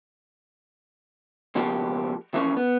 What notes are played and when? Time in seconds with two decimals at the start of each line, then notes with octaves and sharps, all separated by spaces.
1.55 C#2 B2 F3 A#3 G4
2.34 E3 F3 A#3 C#4
2.57 B3